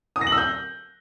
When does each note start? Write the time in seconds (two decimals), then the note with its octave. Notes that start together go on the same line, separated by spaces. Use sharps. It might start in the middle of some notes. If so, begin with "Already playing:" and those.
0.16 D#6
0.21 A#6
0.27 F#7
0.32 E6
0.38 G6